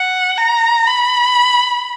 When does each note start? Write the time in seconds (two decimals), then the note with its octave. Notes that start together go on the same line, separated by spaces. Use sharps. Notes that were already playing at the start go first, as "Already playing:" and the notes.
Already playing: F#5
0.37 A#5
0.86 B5